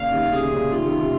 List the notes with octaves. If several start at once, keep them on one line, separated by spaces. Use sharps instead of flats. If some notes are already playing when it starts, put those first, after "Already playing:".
Already playing: A#2 C#3 F5
C3 D#3
C3 G#4
C3
A#2 C#3
C3 D#3 F4
C3 D#3
C3